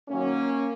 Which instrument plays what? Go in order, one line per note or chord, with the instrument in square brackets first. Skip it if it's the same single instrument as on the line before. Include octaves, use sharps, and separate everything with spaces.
[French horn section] F#2 D#3 F#3 A#3 C#4